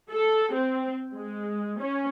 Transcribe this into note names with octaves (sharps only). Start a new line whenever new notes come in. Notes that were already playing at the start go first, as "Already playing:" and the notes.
A4
C4
G#3
C#4